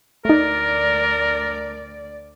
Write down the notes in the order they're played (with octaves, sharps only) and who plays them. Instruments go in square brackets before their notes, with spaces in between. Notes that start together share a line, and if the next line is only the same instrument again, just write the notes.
[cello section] D2 D5 [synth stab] A3 D#4 [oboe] A#4